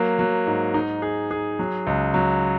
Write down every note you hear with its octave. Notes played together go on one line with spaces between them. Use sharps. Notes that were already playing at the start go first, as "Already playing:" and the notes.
Already playing: F#3 A#3
F#3
G#2
D#4
G#4
G#4
F#3
C#2
F#3